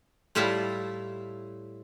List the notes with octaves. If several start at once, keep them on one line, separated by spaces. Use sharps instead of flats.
A2 G3 E4 F4 E5 A5